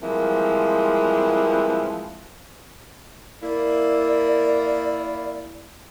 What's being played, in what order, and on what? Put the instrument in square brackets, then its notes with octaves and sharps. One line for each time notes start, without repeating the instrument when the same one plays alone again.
[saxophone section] E3 F3 G3 G#3 A#3 C4
[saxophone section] A#3 E4 [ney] D5